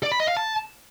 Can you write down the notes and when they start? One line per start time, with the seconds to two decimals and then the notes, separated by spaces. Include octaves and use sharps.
0.03 D5
0.12 B5
0.20 D#5
0.28 F5
0.37 A5